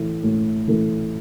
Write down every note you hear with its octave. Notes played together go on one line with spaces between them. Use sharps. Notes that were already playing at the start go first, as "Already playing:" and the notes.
Already playing: A2 E3 A3
A2
E3 A3